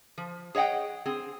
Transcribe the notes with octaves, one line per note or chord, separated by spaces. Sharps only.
F3
G#4 C#5 D#5 F#5 G5
C4 G#4